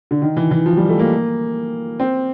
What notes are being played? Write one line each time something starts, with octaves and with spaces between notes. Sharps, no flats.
D3
D#3
E3
E3
F3
G3
A3
A#3
C4